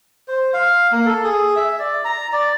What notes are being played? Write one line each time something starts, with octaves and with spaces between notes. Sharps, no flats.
C5
F5
A#3
A4
G#4
E5
D5
A#5
D5